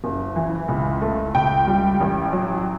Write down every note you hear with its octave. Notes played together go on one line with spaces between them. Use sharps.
F#1
E3
C#2
A3
C#2 G5
G3
A1
F#3